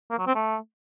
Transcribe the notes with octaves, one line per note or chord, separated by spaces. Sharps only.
A#3
F#3
C4
A3